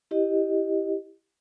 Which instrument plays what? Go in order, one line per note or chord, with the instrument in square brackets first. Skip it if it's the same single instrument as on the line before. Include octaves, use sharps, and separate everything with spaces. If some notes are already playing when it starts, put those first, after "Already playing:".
[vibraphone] E4 G4 D#5